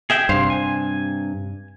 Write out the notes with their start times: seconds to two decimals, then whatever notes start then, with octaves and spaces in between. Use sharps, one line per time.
0.10 G#4 E5 G5
0.29 G2 C3 C5 F5
0.50 G#5